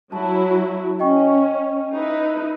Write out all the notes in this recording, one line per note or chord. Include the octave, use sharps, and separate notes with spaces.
F#3 E4 A5
C#4 D#5 G5 C#6
D#4 E4 B4